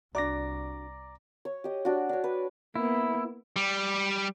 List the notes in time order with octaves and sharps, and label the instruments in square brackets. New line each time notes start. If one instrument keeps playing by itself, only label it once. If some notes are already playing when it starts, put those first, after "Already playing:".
[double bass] C2 [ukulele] D4 F#4 [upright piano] D5 [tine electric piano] A#5 D6 A#6
[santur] C#5
G4 D#5
D4 F#4
D4 C#5
B4
[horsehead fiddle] A#3 B3 [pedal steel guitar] E4
[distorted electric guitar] G3